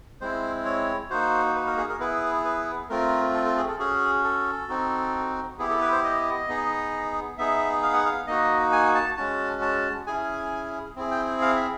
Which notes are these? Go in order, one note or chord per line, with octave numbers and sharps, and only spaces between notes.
G#3 C4 E4 C5
C#5
A#3 D#4 F#4 C5
B4
A#4
G#4
A#4
B3 E4 G#4 B4
B4
A3 C4 F4 A#4
A4
A4
G#4
A4
C#4 F#4 G#4
A4
C4 D#4 F#4
B3 E4 G4 G#4
A4
B4
C5
D#5
B3 D#4 G#4
B3 D#4 G#4 E5
F5
F#5
F5
A#3 D#4 F#4 D#5
G#5
A5
G#3 C#4 F#4 A5
A5
C#4 E4 G#4 G#5
C4 E4 G#4
G5
F5
E5